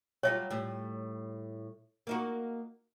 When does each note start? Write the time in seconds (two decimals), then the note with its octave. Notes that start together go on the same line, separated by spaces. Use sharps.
0.23 F#3 G3 F4 C#5 E5
0.51 A2 G3
2.07 A#3 D#4 F#4